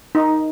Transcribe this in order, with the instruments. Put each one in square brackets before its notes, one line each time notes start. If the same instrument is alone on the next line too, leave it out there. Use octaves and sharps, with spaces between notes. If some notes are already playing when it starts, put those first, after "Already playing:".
[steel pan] D#4